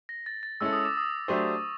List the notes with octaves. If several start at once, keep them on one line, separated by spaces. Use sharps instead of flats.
A#6
A6
A6
G#3 C#4 E4 A4 E6
D#6
D6
D#6
F#3 A3 D4 G4 C5 C#6